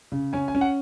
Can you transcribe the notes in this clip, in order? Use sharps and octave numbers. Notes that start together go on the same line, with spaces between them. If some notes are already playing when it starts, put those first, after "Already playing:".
C#3
C#4 G#5
G#5
C#4
F#5